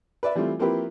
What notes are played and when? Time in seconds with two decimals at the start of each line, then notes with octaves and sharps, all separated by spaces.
0.23 B4 D5 E5
0.35 E3 G3 A3 C4 F4
0.59 F3 A#3 C4 E4 G4 B4